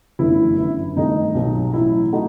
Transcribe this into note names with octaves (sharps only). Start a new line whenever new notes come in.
G1 F#2 E3 A3 E4
G1 F#2 F#3
G2 D#3 A3 C4 D#4
B1 B2 F#3
A1 A2 F#3 E4
A3 D#4 F#4